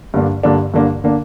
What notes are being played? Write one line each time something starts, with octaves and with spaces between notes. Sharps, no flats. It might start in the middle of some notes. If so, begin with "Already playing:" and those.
G2 D3 A#3 D4
G2 D3 A#3 D4
G2 D3 A#3 D4
D3 A#3 D4